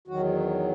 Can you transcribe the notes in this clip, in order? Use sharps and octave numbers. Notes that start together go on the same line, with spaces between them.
E2 D#3 F#3 F#4